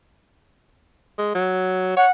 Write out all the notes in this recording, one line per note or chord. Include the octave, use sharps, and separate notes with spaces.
G#3
F#3
C#5 F#5